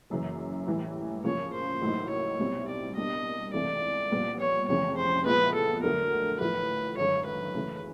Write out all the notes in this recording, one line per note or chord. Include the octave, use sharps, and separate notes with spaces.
F#1 F#2 C#3 E3
A2 E3 G3
C#3 F3 A#3 C#5
C5
A1 A2 F#3 A#3 D#4
C#5
C2 B2 G3 C4 E4
D5
B2 G3 A#3 D4 G4 D#5
C#2 C3 E3 A3 D5
A#1 A#2 G3 B3
C#5
F1 F2 C#3 E3 C#5
C5
A#2 F3 G#3 B3 E4 B4
A4
D2 D3 F#3 A3 A#4
A1 A2 F3 A3 B4
G#1 F#2 D3 C#5
B4
C#3 E3 A3 C#4